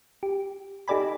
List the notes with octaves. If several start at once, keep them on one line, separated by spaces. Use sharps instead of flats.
G4
D#4 G4 A4 D5 G#5 B5